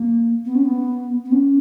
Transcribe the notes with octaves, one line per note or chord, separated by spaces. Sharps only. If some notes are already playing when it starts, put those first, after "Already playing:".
Already playing: A#3
B3
C#4
B3
B3
C#4